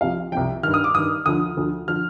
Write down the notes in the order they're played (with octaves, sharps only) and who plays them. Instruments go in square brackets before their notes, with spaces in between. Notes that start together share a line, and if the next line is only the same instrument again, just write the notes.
[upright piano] C2 C3 F3 F5
C2 C3 F3 G5
D#3 F6
G2
D#6
D6
G2 D#3 D#6
D2 D3 F3 D#6
D2 D3 F3
D3 F3 F6